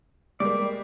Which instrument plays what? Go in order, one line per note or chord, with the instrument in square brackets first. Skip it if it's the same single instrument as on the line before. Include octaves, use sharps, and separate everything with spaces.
[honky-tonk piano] G3 G#3 A#3 [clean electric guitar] D5